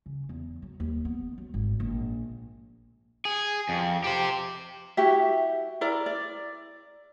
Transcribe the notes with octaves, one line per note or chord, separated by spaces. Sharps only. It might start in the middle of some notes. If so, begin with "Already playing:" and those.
C#3
E2
F#3
D#2
B3
F#3
G#1
A#1
G#4
F2
G4 C5
E4 F#4 G4 E5
E4 A#4 D5
D5